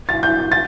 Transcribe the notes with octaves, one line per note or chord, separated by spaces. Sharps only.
A6
G6
A6